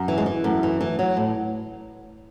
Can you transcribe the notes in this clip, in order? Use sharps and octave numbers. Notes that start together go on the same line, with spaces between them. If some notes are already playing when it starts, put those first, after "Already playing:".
Already playing: F#2
E3
G#3
E3
F#2 A3
E3
E3
F#3
A2